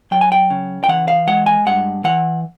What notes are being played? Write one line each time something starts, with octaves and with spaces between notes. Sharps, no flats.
F#3 G5
G#5
G5
C#3
G5
E3 F#5
F5
G#3 F#5
G#5
G2 F#5
E3 F#5